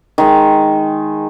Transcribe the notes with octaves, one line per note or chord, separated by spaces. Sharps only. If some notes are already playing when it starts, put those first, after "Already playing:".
D#3 G#3